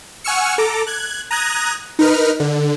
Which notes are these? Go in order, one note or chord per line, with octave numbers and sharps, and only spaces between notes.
F#5 G#5 C#6 E6 F6 C#7
A4 A#5 D6
F#6 G#6
A#5 D#6 F#6 G#6 A#6
D#4 A#4 B4 F6
D3